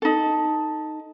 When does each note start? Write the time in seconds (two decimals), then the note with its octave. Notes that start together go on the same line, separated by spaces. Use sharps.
0.02 D#4 A4